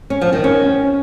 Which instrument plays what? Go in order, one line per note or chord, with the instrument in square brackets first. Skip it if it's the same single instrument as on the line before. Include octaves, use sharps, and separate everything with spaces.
[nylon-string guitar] C#4
F3
D#3
C#4